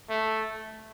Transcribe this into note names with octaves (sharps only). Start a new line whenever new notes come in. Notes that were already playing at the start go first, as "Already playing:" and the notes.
A3